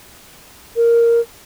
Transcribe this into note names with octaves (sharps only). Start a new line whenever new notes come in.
A#4